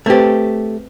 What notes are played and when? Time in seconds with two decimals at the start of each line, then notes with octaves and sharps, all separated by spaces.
0.06 A3 C4 G4 B4 C5